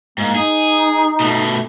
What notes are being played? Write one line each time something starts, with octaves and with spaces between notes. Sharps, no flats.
G#2 A#3
D#4 G#4
B2 A3